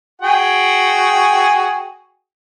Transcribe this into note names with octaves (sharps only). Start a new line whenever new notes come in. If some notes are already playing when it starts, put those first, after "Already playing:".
F#4 G#4 G5